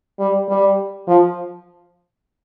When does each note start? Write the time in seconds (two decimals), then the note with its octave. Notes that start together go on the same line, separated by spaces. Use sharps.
0.19 G3
0.49 G3
1.08 F3